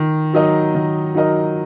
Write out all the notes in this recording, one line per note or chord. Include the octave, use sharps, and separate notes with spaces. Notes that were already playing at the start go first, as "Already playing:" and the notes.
Already playing: D#3
F#3 D#4 A#4 D#5
D#3
F#3 D#4 A#4 D#5